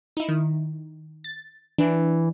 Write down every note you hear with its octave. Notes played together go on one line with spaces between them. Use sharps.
D#4 E4
D#3
A6
E3 D4